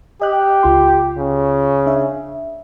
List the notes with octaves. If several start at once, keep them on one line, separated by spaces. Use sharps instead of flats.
G4 D#5 F#6
C#2 F4 C6
C#3
D4 E5